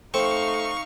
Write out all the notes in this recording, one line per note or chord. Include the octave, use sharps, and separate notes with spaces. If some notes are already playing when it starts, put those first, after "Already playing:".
A3 C4 D#4 F5 C#6